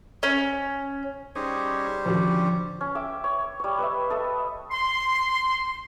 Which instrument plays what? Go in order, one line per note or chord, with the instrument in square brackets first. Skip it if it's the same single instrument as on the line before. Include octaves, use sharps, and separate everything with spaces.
[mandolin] C#4
[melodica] G3 G4 C5 [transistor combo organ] C#4 D#4 G#4
[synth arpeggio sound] A2 D#3 F#4 [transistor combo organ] D3 C#4 [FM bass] F3
[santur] C#4
E5 G5 D6
C#5
G3 C#5
B4 D#5 E5
A4 D#5 E5
[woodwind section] C6